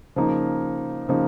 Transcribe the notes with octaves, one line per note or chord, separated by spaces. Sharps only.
C#3 F3 A#3 D#4
C#3 F3 A#3 D#4